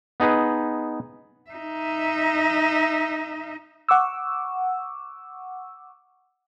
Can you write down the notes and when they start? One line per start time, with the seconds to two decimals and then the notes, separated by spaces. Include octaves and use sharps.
0.20 B3 D#4 G#4 B4
1.50 D#4 E5
3.89 F#5 C#6 D6 E6